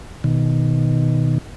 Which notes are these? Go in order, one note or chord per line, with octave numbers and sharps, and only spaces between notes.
B2 D#3